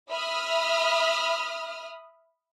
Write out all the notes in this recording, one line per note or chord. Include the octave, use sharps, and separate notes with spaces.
E5 B5 D#6 F6